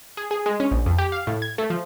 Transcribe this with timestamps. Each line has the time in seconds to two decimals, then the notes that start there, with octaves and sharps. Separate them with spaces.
0.17 G#4
0.31 G#4
0.46 G#3
0.60 C#4
0.71 A#1
0.86 F2
0.98 G4
1.12 F5
1.27 A2
1.42 G#6
1.58 A3
1.70 F3